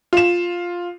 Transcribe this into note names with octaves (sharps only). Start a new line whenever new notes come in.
F4 E7